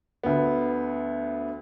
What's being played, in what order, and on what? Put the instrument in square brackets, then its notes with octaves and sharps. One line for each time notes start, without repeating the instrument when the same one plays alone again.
[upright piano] D2 B3